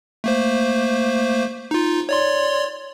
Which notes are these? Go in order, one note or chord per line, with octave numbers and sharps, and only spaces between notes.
A3 A#3 C5
D#4 F4
C#5 D5 C6